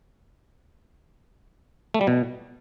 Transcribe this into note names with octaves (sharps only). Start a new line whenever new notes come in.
A3
G3
B2